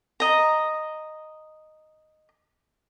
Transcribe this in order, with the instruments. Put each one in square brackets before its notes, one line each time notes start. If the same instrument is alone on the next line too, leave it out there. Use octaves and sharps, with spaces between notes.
[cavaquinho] D#5 A#5